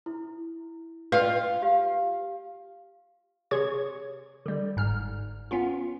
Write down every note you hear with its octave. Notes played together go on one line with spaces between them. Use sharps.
E4
F4 B4
G4 F5
C3 G#4 C#5 C#6 G#6
D3 G3
G1 G#2 F6
B3 C#4 F4